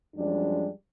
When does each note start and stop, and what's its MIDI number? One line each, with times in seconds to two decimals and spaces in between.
0.16 0.69 42
0.16 0.69 53
0.16 0.69 55
0.16 0.69 56
0.16 0.69 62